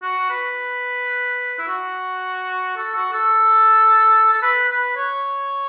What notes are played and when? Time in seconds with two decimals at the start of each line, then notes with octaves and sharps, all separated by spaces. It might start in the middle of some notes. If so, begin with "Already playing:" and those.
0.02 F#4
0.30 B4
1.58 E4
1.67 F#4
2.77 A4
2.95 F#4
3.13 A4
4.33 A4
4.42 B4
4.69 B4
4.96 C#5